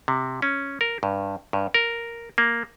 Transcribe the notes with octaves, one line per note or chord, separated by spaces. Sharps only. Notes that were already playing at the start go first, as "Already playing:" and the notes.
C3
C#4
A#4
G2
G2
A#4
A#3